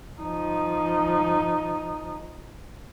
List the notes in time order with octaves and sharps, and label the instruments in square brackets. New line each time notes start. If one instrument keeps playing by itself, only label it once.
[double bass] F3 D#4